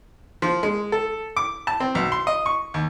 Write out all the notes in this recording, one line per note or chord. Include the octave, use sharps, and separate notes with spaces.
F3
G#3
A4
D6
A5
C4
B1
C6
D#5
C#6
D#2